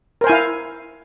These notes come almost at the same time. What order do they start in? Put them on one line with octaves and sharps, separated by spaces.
A#4 C5 G#5 E4 F5